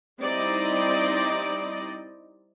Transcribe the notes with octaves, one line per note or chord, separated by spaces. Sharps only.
G3 C4 D#4 E4 D5 D#5